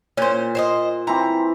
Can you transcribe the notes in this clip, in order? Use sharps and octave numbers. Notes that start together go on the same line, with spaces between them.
A#2 C#4 C5
C5 C#5 D#5
E3 C4 A#5